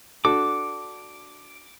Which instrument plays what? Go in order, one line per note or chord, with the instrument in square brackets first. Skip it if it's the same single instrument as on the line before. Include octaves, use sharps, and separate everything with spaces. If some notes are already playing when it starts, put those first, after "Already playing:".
[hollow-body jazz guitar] D4 F#4 A4 [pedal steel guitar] D6